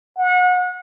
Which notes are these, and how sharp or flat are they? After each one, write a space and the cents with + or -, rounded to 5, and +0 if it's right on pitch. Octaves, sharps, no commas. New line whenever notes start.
F#5 -30